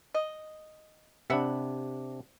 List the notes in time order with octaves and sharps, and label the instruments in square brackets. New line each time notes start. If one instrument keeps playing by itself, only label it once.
[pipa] D#5
[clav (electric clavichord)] C3 D4 [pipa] E5 F#5 B5